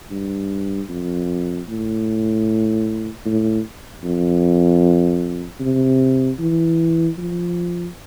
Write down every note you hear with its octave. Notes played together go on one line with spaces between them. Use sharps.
G2
F2
A2
A2
F2
C3
E3
F3